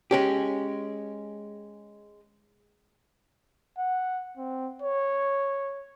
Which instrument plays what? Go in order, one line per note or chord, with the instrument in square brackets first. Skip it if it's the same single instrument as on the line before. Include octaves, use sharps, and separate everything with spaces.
[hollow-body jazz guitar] G#3 C#4 G4
[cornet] F#5
C4
C#5